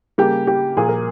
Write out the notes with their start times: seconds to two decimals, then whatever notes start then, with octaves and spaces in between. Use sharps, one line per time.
0.18 C#3 G3 A#3 G4
0.47 G4
0.77 A#2 F3 A#3 G#4
0.89 A#4